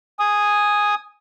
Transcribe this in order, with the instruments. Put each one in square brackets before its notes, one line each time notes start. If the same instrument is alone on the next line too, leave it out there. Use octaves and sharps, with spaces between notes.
[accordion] G#5 D#6